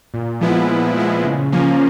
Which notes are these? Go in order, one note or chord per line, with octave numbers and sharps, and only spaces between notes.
A#2
F3 G#3 B3 E4
A#2
F3 G#3 B3 E4
C#3
F3 A#3 C#4